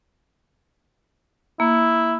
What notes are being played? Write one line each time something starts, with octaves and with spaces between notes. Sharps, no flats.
A#3 E4